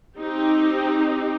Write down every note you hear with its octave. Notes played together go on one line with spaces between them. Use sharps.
C4 D#4 G4